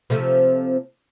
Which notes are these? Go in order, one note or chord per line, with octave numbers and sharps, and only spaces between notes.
C3 F3 A3